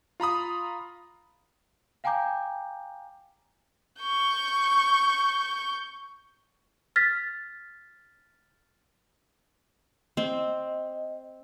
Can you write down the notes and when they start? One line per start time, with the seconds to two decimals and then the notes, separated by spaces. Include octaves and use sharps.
0.20 F4 A#5 B5 D#6
2.04 F5 G5 G#5 A#5 D6 G6
4.01 C#6 G6
6.96 F6 A6 B6
10.17 C4 D#5